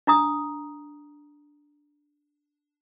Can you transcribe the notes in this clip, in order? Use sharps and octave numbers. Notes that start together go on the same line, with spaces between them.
D4 A#5 D#6